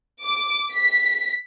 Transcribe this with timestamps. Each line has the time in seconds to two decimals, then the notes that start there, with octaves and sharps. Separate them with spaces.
0.24 D6
0.72 B6